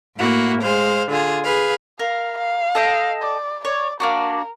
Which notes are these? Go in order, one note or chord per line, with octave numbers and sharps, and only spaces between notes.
A2 A#3 E4 F#4
G#3 C5 F5
D3 F4 G#4
G#4 B4 F5
A#4 F5
F5
A4 D#5 G5
D5
C#5 D5
A#3 D4 F#4 A#4